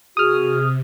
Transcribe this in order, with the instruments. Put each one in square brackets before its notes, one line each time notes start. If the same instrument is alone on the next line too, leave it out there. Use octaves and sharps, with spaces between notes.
[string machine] C3 [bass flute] F#4 [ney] G#4 [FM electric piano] D#6 F6